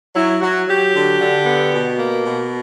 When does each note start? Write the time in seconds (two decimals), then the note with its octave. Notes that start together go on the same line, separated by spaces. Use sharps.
0.16 F#3 E4
0.41 F#3 F#4
0.68 F#3 G4
0.94 D3
1.20 D3
1.46 B3
1.72 B2
1.98 A#3
2.25 B2